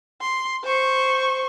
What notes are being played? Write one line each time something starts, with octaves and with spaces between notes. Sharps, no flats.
C6
C5 C#6